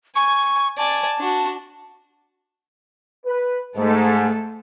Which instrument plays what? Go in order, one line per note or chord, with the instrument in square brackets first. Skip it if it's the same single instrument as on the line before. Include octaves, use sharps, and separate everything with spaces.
[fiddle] G#5 [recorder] C#6
[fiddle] D5 G#5 [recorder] A5
[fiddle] D4 F#4
[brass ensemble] B4
[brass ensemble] G#2 [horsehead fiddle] A3 A4